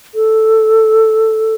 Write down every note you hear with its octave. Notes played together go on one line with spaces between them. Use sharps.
A4